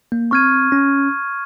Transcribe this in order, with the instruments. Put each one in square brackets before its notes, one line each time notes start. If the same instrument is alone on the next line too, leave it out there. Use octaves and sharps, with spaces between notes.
[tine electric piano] A#3
[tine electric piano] C4 [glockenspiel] C#6 F6 G#6 D#7
[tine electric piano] C#4